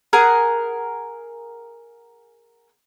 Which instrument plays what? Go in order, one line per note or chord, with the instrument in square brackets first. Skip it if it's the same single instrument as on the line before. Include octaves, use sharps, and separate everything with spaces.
[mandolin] G#4 A#4 F#5 G#5